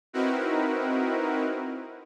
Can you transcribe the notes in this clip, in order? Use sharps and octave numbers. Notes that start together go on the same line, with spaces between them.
C4 D#4 E4 F#4 A#4 B4